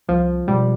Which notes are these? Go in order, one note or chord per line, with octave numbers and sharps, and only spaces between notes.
C2 F3
B2 G3 G#3